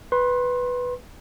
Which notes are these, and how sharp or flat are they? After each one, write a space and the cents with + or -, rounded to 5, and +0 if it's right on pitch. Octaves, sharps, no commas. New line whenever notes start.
B4 +0 C6 +30